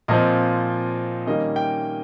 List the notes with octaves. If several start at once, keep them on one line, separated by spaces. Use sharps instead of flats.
A#2 F3 C4 D#5
D#3 G3 A#3 C#4 D#5
G5